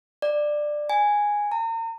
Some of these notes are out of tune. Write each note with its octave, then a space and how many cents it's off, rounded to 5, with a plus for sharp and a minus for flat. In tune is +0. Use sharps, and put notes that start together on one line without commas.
D5 +15
G#5 -5
A#5 -40